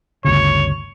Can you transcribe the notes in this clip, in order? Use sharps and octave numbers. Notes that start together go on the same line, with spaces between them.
G1 D2 C#3 C#5